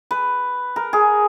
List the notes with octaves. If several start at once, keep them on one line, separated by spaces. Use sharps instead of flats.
B4
A#4
G#4